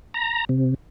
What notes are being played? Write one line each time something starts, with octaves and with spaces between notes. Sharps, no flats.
A#5
C3